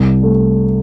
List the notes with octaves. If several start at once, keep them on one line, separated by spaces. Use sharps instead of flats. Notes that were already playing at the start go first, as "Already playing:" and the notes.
Already playing: C2
A3